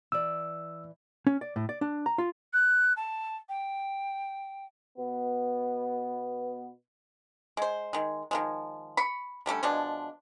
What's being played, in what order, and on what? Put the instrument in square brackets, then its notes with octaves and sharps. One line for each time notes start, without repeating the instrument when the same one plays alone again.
[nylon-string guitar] E3 D5 [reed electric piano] E6
[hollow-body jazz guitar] C#4
D5
A2
D5
D4
A#5
F4
[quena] F#6
A5
G5
[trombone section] B2 B3
[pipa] G#3 C5
D#3 G#3
D#3 F3 G#3
B5 C#6
D3 G3 A3 C#4
B2 F3 G#3 D4